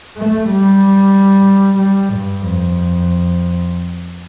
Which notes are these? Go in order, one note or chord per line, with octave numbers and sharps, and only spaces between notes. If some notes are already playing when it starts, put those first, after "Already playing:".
A3
G3
G3
G2
F2